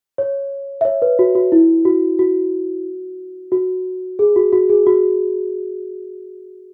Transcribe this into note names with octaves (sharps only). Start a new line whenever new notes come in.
C#5
E5
C#5
B4
F#4
F#4
E4
F#4
F#4
F#4
G#4
F#4
F#4
G#4
F#4